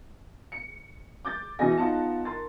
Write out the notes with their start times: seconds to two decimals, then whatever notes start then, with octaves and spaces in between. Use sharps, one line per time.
0.52 C#7
1.25 D6 G6 A6
1.59 B2 E3 D#5 G#5 A#6
1.78 B3 D#4 F4 F#5 A5
2.25 A#4 C6 A6